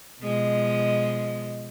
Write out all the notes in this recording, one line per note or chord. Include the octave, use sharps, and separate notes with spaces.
B2 F3 G#3